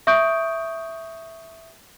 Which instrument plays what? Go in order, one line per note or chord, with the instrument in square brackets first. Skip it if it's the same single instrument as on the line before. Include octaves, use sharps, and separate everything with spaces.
[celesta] E5 C#6 D#6 G6 D7